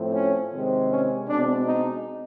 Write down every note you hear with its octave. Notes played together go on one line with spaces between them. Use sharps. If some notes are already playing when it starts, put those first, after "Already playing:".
Already playing: A2 F3 A3 C4
C#4
C3 D#3 G#3 C4
C#4
B2 G#3 C4 D4
D#4